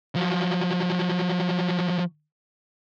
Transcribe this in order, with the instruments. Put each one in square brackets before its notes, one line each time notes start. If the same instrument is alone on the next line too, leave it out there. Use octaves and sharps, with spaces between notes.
[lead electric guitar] F3 F#3